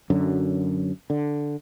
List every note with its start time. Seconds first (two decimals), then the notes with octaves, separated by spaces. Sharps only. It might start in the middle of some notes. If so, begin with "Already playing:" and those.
0.10 F#2 D3 F#3
1.10 D3